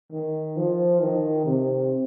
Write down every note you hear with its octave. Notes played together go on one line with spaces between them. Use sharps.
D#3
F3
D#3
C3